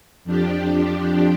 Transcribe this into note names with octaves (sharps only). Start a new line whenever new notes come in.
F2 F3 D4 G4